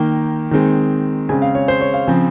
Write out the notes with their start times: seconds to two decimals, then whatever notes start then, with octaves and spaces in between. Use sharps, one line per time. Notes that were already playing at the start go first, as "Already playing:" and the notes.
Already playing: D#3 A#3 G5
0.51 D#3 G#3 C4
1.29 C#3 G#3 C4 G#5
1.42 F5
1.55 C#5
1.68 C5
1.81 C#5
1.94 F5
2.07 C#3 F3 C4